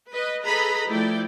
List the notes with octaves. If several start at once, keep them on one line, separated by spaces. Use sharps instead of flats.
B4 D#5
G#4 A4 B4 D#5 A#5 B5
F3 A3 E4 D5 G5